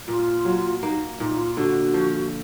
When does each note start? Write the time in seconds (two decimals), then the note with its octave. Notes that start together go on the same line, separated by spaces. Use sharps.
0.08 A#2 F4
0.45 F#3
0.82 A#3 D#4
1.19 A#2 D#4
1.38 F4
1.56 D3 F#4
1.94 F3